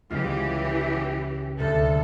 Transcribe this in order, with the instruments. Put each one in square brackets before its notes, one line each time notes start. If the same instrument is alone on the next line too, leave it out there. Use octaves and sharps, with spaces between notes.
[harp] C#2 F4 [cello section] E3 G4
[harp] D2 C3 [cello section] A4